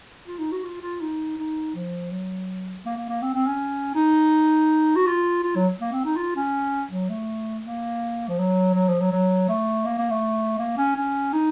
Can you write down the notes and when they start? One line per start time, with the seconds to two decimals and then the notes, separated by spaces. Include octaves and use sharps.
0.28 F4
0.39 D#4
0.52 F#4
0.64 F4
0.82 F4
1.01 D#4
1.38 D#4
1.75 F3
2.11 F#3
2.85 A#3
2.97 A#3
3.09 A#3
3.22 C4
3.34 C4
3.47 C#4
3.95 D#4
4.96 F#4
5.07 F4
5.44 F4
5.56 F#3
5.81 A#3
5.92 C4
6.05 D#4
6.17 F4
6.36 C#4
6.91 F#3
7.10 A3
7.65 A#3
8.28 F3
8.39 F#3
8.75 F#3
8.88 F3
9.00 F#3
9.12 F#3
9.49 A3
9.85 A#3
9.98 A#3
10.10 A3
10.59 A#3
10.77 C#4
10.96 C#4
11.33 D#4